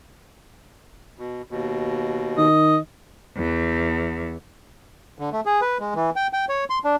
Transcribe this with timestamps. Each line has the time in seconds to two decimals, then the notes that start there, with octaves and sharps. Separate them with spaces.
1.19 B2
1.51 D#2 B2
2.38 D#3 D#5
3.36 E2
5.19 D3
5.32 A3
5.46 G#4
5.61 B4
5.80 G#3
5.95 E3
6.16 G5
6.33 G5
6.49 C#5
6.70 C6
6.84 D4